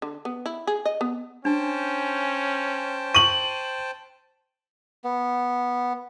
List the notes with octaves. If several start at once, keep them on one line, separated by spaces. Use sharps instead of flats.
D3
B3
E4
G#4
D#5
B3
C#4 D4 C5 G5 A5
C#6 D#7 F#7
B3